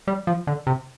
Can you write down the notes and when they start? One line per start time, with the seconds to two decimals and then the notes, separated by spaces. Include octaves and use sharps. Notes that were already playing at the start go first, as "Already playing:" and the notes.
0.07 G3
0.27 F3
0.47 D3
0.67 C3